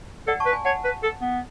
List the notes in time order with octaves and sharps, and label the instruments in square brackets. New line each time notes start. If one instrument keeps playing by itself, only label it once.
[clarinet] A4 [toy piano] D5 F#5
[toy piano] A5 C#6
[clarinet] B4
[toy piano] G#5 B5
[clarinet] C#5 [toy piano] F#5 A5
[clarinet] B4
A4
B3